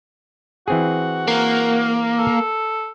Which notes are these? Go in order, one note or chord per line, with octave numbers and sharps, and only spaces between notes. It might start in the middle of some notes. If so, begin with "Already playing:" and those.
E3 C4 F#4 G#4
A#3
A4